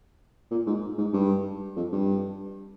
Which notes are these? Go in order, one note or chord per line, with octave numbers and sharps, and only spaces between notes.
A#2
G#2
G#2
G2
F2
G2